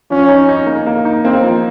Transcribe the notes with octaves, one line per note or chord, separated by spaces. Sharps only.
F3 C#4
D#4
D#4
A#3
A#3
D#4
A#3 C4
F3